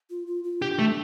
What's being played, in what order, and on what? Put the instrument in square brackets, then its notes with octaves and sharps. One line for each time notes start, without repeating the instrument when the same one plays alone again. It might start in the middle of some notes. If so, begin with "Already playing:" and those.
[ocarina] F4
F4
F4
[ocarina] D4 [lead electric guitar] G4
[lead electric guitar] A3